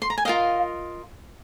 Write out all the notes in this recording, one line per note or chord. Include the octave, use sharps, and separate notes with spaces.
C6
A#5
G#5
F4 A#4 D#5 F5